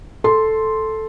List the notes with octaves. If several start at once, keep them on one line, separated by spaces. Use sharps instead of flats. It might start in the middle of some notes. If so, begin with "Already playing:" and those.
A4 C6